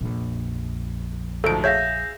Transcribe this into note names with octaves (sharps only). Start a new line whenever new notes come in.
A#1 F2
D2 G#2 F3 A4 D7
G#4 C#5 E5 F5 G6 A#6